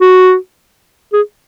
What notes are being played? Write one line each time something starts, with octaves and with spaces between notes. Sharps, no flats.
F#4
G#4